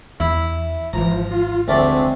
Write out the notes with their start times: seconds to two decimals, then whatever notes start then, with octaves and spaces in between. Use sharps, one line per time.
0.20 E2 E4
0.93 G#1 E3 F3 A#5
1.31 F4
1.68 F1 D2 G#3 A3 C4 D5